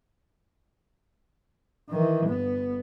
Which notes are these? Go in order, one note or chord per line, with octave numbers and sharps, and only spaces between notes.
D#3 E3
G1 B3